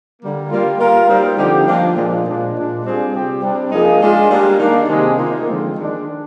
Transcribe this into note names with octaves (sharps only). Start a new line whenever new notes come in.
D3 G3 A#3
G3 A#3 F4
G3 A#3 F4 A#4
G3 C4 D#4
D3 F3 C4 D#4 G4
F3 A#3 D4
A#2 F3 G#3
A#2 F3 G#3 D4
A#2 G#3 D4
G3 C4 F4 G#4
C3 G3 C4 G4
C3 G3 D4
F3 A#3 D#4 G#4
G#3 D4 F4
G3 A#3 D4
D#3 A#3 D4
C3 D#3 G#3
D#3 A#3 F4
D3 F3 G#3 C4
D#3 G#3 D4